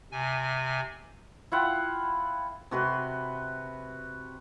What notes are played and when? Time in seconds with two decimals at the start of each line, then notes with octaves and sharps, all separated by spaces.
0.12 C3 G#5
1.52 E4 F4 F#5 G5
2.71 C3 F#4 B4 C6